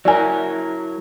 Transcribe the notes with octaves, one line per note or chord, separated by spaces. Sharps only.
F#3 E4 A#4 D5 G#5